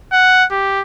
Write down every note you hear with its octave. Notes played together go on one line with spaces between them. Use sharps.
F#5
G4